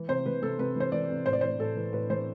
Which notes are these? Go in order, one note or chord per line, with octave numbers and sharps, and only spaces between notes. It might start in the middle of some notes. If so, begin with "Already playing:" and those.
Already playing: E3
C3 C5
E3 B4
C3 A4
C3 B4
E3 C5
E3 D5
C3
A2 C5
D5
E3 C5
A2 A4
E3
A2 B4
E3 C5